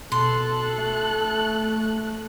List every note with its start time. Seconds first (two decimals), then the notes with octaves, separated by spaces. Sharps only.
0.12 B2 A4 C6 F#6
0.78 A3